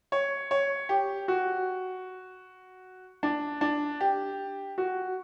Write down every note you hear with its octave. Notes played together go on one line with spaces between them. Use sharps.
C#5
C#5
G4
F#4
D4
D4
G4
F#4